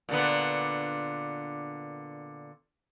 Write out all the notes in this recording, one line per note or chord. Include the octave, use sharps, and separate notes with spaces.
A#2 D3 B3